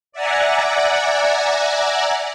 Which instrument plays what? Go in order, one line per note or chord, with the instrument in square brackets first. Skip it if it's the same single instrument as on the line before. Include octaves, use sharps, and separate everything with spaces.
[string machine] D5 E5 F#5 G#5 A#5